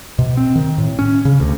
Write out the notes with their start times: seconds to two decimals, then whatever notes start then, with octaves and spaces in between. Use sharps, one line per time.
0.19 B2
0.37 C4
0.56 D#3
0.78 A2
0.99 C#4
1.25 C#3
1.40 D2